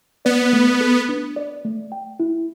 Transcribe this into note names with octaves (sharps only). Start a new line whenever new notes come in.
B3 D5
A3
A4
D4
D5
A3
G5
E4